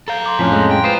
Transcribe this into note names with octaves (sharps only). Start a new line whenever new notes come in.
A4 F5 A#5 G6
C6 D6
F2 A2 F3 C#4 F#6 B6
G#3
G5
F4 B4 C5 D#6